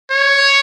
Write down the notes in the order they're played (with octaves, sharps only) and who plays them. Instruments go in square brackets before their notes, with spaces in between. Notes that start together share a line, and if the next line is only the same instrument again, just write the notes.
[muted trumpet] C#5